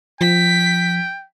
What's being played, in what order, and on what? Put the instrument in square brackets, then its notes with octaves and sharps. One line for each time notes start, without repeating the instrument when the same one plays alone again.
[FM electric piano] F3 [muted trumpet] G5 [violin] B6